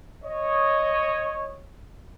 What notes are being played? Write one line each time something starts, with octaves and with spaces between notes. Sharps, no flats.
C#5 D#5